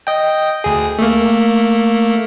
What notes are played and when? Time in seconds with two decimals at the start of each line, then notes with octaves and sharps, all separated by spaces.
0.07 D#5 G5
0.64 D2 G#4
0.99 A3 A#3